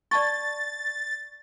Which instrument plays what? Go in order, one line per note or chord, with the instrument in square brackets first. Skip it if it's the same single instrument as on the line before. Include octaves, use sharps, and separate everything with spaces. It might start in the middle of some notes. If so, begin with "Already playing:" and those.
[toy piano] D5 A5 C#6 [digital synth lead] A6